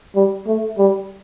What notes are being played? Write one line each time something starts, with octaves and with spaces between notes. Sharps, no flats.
G3
A3
G3